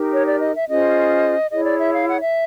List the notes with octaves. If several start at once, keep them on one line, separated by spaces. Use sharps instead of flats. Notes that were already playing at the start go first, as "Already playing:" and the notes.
Already playing: D#4 G4 A#4
C#5
D5
D#5
E5
C#4 F4 G#4 C5 D#5
E4 G#4 C#5 D#5
D5
E5
F5
F#5
E5